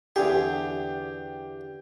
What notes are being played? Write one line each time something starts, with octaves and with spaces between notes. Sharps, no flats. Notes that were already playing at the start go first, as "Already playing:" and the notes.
E2 D3 G4 G#4